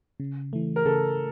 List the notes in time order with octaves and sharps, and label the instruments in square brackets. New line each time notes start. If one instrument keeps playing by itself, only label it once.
[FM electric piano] C#3
E3 A3
[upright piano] A#4
[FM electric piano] C#3 [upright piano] A4